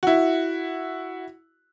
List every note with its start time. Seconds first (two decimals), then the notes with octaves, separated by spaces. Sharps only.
0.03 E4 F#4